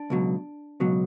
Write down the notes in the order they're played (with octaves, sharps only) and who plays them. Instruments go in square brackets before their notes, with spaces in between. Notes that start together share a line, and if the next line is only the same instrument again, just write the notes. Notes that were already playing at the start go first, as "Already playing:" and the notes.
Already playing: [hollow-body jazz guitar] D4
C#2 B2 F#3
C#2 B2 F#3